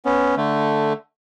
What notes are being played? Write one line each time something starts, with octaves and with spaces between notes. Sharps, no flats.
B3 C#4
D3 A3